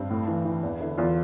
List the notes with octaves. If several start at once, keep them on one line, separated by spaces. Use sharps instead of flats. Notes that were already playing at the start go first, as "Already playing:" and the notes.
Already playing: G2 C4
A2
E3
E3
E2
D3 E4
E2 F4